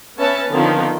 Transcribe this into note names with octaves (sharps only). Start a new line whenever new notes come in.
B3 C#4 B4 E5 A5
D3 D#3 F3 B3 C4 D#4